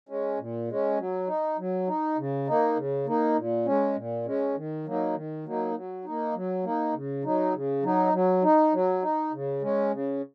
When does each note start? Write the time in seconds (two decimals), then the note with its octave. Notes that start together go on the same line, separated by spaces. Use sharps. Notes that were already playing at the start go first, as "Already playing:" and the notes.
0.09 G#3 C#4
0.39 A#2
0.68 G#3 C#4
0.98 F#3
1.27 D#4
1.58 F#3
1.87 D#4
2.18 C#3
2.48 A#3 D#4
2.76 C#3
3.07 A#3 D#4
3.37 A#2
3.66 G#3 C#4
3.96 A#2
4.26 G#3 C#4
4.56 D#3
4.86 F#3 A#3 D#4
5.15 D#3
5.45 F#3 A#3 D#4
5.75 F#3
6.05 A#3 D#4
6.35 F#3
6.64 A#3 D#4
6.94 C#3
7.24 F#3 D#4
7.54 C#3
7.83 F#3 D#4
8.13 F#3
8.43 D#4
8.73 F#3
9.02 D#4
9.33 C#3
9.62 G#3 C#4
9.92 C#3